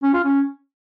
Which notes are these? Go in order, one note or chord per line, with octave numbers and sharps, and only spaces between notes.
C#4
F4
C#4